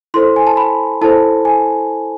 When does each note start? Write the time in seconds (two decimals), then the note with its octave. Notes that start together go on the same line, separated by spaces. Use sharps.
0.14 E4 A4 C5 C6
0.36 G#5
0.47 A5
0.57 B5
1.01 E4 A4 C5 A5
1.45 G#5